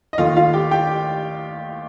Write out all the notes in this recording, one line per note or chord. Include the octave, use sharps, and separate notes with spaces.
D#5
D#2 D#3 A3 F4 F5
F4 F5
G4 G5
G4 G5